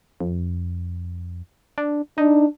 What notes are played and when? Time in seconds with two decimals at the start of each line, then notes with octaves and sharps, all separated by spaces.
0.20 F2
1.78 D4
2.18 D4 D#4